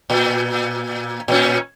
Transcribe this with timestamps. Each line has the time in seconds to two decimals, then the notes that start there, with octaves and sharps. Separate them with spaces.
0.10 A#2
1.28 A#2 C#4